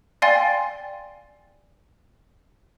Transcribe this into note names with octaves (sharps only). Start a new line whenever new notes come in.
D5 F5 G5 G#5 C6 A6